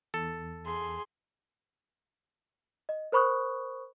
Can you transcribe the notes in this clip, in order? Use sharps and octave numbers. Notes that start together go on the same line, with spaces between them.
E2 A4
G#4 C6
D#5
A#4 C5 B5 C#6 D#6 F#6